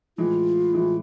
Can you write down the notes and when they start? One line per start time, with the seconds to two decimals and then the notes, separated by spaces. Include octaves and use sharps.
0.18 A2 E3 G#3 F4
0.74 A2 E3 G#3